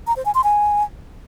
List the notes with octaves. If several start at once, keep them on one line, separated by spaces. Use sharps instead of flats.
A#5
C5
G#5
C6
G#5